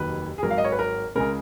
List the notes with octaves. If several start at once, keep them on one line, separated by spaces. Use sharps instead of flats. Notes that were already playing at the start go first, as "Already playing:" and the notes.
Already playing: F1 D#2 D#3 F#3 B4
G#4
G#1 G#2 F#3 A#4
F5
D#5
C#5
B4
A#4
C#2 C#3 G#3 A#4